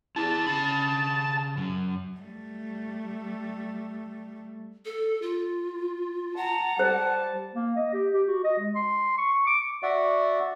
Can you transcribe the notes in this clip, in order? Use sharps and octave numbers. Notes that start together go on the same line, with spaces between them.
E4 G#4 A5
C#3 B5
F#2
G3 A3
A4
F4
F#5 A5 A#5
G3 C5 A5
A#3
D#5
G4
G4
F#4
D#5
G#3
C6
C#6
D6
F#4 D5 E5 F#5